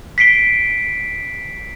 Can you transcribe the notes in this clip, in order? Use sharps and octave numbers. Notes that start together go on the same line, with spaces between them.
B6 C7 D7 G7